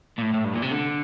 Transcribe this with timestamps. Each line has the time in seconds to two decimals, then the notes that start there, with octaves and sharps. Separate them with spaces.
0.18 A#2
0.22 A2
0.34 A2
0.44 G2
0.54 A#2
0.62 C3
0.71 D3